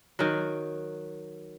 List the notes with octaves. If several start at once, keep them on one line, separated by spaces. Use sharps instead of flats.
D#3 F#3